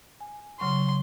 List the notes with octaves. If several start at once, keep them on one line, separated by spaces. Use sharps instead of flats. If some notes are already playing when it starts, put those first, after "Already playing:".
G#5
C#3 F#3 C6 C#6